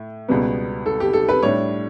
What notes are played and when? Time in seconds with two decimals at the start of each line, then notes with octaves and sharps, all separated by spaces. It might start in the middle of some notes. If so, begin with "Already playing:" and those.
Already playing: A2
0.28 C#2 B2 G3 B3
0.86 A4
1.00 G4
1.13 A4
1.29 B4
1.43 A2 G3 D4 C#5